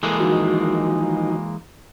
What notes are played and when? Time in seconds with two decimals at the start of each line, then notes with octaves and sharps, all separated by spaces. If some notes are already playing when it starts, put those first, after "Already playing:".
0.03 E3 G#3 A#3 A4 D#5
0.20 D#3 F3 D#4 F#4